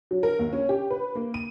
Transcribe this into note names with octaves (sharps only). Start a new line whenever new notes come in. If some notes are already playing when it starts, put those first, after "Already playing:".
F#3
A#4
D#2
C#4
G4
B4
A#3
D#7